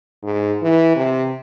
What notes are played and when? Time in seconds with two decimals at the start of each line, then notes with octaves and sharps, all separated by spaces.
0.23 G#2
0.62 E3
0.96 C3